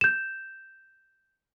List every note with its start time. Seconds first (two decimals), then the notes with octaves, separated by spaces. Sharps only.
0.01 G6 E7